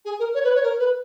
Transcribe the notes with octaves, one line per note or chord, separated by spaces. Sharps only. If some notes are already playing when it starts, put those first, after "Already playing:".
G#4
A#4
C#5
B4
C#5
A#4
B4